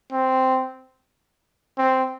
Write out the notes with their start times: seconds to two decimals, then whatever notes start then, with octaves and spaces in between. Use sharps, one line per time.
0.12 C4
1.78 C4